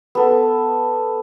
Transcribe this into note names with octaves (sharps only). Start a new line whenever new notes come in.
B3 A4